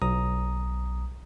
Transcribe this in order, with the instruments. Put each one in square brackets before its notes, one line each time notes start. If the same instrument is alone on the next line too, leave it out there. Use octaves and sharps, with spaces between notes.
[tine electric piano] B1 A#5 D#6